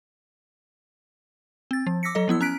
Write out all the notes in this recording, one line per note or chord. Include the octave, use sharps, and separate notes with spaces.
C4 A6
F3
D6 E6 A#6 B6 C#7
F#3 A4 D#5
F3 B3 E4 E6
C#4 A#5 F#6 B6 D7